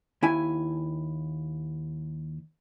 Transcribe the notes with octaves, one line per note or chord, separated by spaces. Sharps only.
D#2 E4 G#5